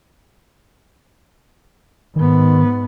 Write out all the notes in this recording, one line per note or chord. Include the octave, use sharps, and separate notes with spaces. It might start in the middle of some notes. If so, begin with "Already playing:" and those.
G#2 D#3 B3